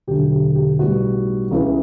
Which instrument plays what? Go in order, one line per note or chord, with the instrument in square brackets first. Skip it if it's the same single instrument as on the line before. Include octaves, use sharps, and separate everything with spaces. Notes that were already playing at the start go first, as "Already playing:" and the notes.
[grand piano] E1 D2 D3 F#3 G4
G4
G4
B1 A2 G3 B3 F#4
C#2 C#3 E3